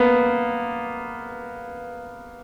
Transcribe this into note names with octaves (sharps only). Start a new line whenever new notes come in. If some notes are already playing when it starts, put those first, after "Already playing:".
Already playing: A#3 B3